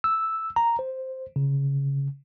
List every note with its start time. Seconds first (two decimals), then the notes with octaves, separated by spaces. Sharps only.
0.04 E6
0.56 A#5
0.79 C5
1.36 C#3